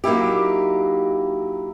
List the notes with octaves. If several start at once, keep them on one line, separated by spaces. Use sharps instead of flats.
F#3 A#3 D#4 E4 G4